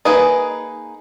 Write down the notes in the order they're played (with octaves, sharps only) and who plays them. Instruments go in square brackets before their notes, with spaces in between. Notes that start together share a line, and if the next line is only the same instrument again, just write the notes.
[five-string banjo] A#3 D#4 G#4 B4 D#5